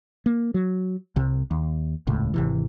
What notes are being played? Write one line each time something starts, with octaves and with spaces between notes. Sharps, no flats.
A#3
F#3
C2 C3
D#2
D#1 C#2 A2
G#1 C3 E3